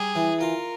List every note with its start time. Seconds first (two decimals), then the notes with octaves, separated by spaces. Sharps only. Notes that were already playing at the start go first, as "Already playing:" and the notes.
Already playing: G3 G#4
0.15 E3
0.40 F4 A#4